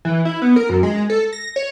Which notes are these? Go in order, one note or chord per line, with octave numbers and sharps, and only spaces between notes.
E3
E4
B3
A#4
F#2
G#3
A4
A#6
C#5